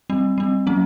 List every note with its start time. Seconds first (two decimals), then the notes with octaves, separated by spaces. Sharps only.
0.10 G3 C4
0.38 G3 C4
0.67 F#3 A#3 C#4